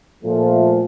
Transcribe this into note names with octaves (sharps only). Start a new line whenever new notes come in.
A#2 F3 A3